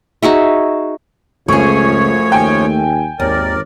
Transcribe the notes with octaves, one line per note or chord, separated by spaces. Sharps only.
D#4 F#4 G#4 E5
C#2 F#2 F3 A3 G#4 C#5 C#6
D#2 G5 G#5
G#1 D#2 A#4 D5